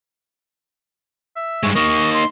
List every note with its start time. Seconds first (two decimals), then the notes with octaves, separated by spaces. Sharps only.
1.36 E5
1.63 G2 G#3 C#6
1.75 A#3 D#4 D#5 C#6
2.14 C6